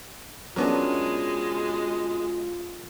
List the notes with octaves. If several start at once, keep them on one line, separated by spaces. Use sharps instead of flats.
B2 F#3 G#3 B3 C#4 D4 F4 A#4